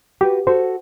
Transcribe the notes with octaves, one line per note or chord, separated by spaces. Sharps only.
F#4 G4 B4
F#4 A4 C5